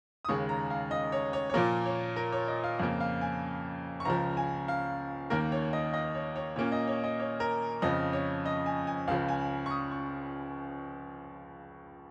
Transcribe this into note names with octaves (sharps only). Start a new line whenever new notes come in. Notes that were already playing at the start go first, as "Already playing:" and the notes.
D#6
D#2 C#3 G#3 C#6
A#5
F5
D#5
C#5
C#5
C#5
A#2 F3 A#3 A#4
C#5
A#4
C#5
D#5
F5
F2 C#3 A#3 F5
F5
G#5
C#6
C#2 C#3 F3 A#5
G#5
F5
D#2 D#3 A#3 A#4
C#5
D#5
D#5
C#5
C#5
A#2 A#3 C#4 C#5
D#5
C#5
D#5
C#5
A#4
F2 C#3 F3 D#5
C#5
D#5
G#5
G#5
C#2 C#3 F3 F5
G#5
C#6
D#6
C#6